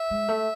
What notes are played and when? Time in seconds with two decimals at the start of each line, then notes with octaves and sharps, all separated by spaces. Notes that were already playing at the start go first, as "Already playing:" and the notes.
Already playing: E5
0.11 G#3
0.28 A3